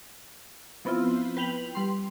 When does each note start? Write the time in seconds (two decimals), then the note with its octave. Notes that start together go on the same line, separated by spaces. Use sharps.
0.85 F3 B3 C4 E4 F4
1.37 B4 G5 F7 F#7
1.75 G3 C6